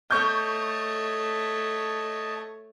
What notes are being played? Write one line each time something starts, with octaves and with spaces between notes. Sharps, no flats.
A3 C#5 D#5 A5 C#6 G6